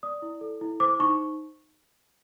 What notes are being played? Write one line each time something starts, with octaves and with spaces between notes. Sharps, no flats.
D5 D#6
E4
A4
E4
C5 D6
D#4 C#6